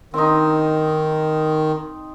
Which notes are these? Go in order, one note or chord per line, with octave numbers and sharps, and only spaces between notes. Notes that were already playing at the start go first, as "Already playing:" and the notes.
D#3 C4 D#4